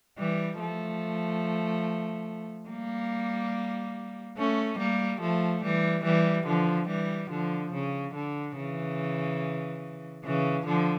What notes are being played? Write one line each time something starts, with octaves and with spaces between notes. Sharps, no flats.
E3 G3
F3 A3
G3 A#3
A3 C#4
G3 A#3
F3 A3
E3 G3
E3 G3
D3 F3
E3 G3
D3 F3
C#3
D3
C#3 E3
C#3 E3
D3 F3